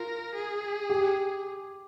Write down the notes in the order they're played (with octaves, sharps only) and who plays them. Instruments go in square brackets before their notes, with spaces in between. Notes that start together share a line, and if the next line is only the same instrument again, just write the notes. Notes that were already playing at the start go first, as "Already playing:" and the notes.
Already playing: [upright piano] F4 [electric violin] A#4
[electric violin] G#4
[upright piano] G4